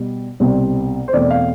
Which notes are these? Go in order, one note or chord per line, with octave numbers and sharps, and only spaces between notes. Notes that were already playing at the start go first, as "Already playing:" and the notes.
Already playing: B2 G3
C2 B2 G3 C4
C5
E2 B2 A3 C4 D5
F5